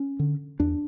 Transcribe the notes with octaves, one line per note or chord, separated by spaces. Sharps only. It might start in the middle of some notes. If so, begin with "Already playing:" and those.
Already playing: C#4
D3
E2 D4